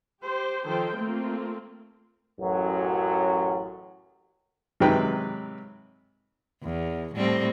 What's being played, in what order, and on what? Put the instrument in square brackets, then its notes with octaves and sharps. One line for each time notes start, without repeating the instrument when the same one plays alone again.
[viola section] G4 C5
D#3 F3 A4 C5 G5
A3 A#3 C4 F4
[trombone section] A1 F#2 F#3
[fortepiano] G#2 C3 D#3 F#3 B4 G5
[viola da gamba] E2
A2 G3 C4